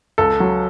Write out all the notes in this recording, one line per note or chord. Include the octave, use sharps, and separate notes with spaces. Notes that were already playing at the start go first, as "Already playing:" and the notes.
C#2 A4
F#3